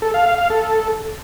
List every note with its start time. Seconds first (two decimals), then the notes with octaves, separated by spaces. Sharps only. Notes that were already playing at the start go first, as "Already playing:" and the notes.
0.02 A4
0.14 F5
0.26 F5
0.38 F5
0.50 A4